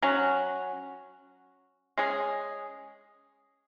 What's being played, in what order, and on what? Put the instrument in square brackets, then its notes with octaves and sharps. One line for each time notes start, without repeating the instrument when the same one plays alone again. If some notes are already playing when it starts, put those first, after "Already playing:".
[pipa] F#3 C#4 F#4
G#3 C#4 G#4